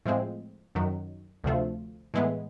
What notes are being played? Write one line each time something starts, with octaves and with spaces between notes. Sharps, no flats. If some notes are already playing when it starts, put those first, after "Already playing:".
A2 F3 G#3 C4
F#2 D#3 F#3
D2 C3 F3 A3
A2 E3 G#3 B3